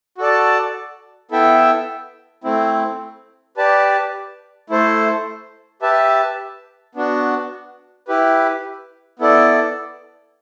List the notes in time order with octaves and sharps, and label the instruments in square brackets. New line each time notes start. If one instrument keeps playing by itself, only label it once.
[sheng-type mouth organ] F#4 A4 D5 A5
B3 E4 A4 E5 G5
A3 C4 E4
G4 B4 D5 A5
A3 E4 A4 C5
G4 B4 E5 A5
B3 D4 F#4
E4 G4 B4
B3 E4 A4 D5